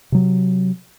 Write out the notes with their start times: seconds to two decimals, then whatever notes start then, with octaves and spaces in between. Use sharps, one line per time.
0.12 C3 F#3